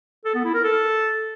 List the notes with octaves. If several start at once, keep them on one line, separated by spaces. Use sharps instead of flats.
A4
B3
E4
A#4
A4